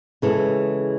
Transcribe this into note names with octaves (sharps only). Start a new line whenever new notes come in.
C#3 E3 G#3 A4